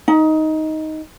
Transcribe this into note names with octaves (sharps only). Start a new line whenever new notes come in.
D#4